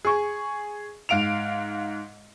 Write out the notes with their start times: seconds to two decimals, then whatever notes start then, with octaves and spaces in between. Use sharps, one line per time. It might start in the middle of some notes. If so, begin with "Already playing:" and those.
0.05 G#4 C#6
1.09 G#2 F5 D7 F7